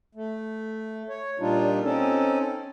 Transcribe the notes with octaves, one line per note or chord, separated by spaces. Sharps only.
A3
C#5
A#2 G3 D4 D#4 F4
C4 C#4 D#4 A4